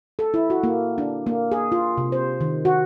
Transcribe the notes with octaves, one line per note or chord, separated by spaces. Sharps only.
A4
E4
F#4
A#3
D4
A#3
G#4
F4
C3
C5
D#3
F#4